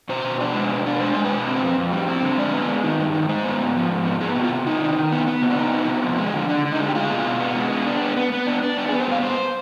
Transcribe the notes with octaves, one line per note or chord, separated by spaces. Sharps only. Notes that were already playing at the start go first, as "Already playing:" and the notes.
B2 C5
B2
D4
G#3
B2
D4
G#3 C5
G#3 C5
B4
B2
C4
F2
F2
G3
C4
D3
G#3 D5
B3
G#3
D#3
G2
D#3
G#3 C5
B3
G#2
F3
G#2
B3
B3 G#4
C3
F4
C3
C3 D#4
D#3
D#3
B3
B3
C3
D4
C3 D#4
B3
C3
F3
G#3
D3
D3 D4
D3
D#4
G#3
G4
G#3 F4
B2
B2
B3
G#3
B3
D4
B3
B3
B3
D4
D4
B3
G#4
B3
C5
G2 F5
G2 C5